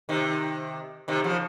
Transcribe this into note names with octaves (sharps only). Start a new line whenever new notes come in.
C3 D#3
C3 D#3
C#3 F3